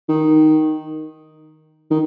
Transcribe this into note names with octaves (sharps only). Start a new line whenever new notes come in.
D#3
D#3